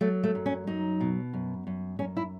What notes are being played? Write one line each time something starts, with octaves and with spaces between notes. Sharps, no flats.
F#3 A3
A3
F#2
C#4
F#3 D#4
B2
F#2
F#2
F#2 C#4
E4